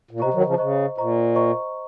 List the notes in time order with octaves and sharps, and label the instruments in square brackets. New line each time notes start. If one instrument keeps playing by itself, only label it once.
[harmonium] A#2
[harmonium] C3 [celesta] C5 D#5 A#5 C#6
[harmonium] D#3 F#3
C#3 F3
[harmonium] C#3 [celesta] C5 D#5 A#5 C#6
[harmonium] A#2 [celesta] C5 D#5 A#5 C#6
[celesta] C5 D#5 A#5 C#6